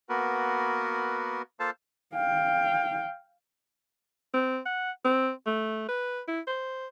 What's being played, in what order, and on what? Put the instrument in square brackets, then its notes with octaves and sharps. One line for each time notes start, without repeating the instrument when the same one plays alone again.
[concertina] A#3 B3 F#4 A#4 B4
A#3 F4 A4 C5 F5 A5
[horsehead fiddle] F5 G5
[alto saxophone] C4
F#5
C4
A3
B4
E4
C5